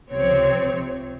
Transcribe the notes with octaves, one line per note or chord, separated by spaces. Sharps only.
C#2 C3 F3 C4 C#5